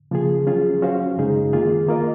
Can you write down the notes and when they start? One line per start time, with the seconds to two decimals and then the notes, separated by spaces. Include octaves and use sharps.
0.11 C#3 F3 A#3 F4 G#4
0.47 F#3 C#4 F4 G#4
0.82 F#3 C#4 F#4 C5 F5
1.17 F#2 C#3 G#3 D#4 G#4
1.53 D#3 A#3 F4 G#4
1.88 A#3 F4 A#4 D#5